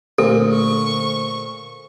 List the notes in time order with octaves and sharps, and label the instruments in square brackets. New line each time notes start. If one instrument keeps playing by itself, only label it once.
[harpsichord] A#2 [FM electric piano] D3 A3 C5 [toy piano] A4
[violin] C#6